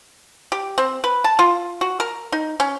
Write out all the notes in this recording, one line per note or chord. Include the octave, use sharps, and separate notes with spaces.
G4
C4
B4
A5
F4
F#4
A#4
D#4
C#4